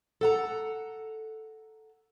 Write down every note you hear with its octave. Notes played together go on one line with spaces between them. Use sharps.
A4 F#5 A#5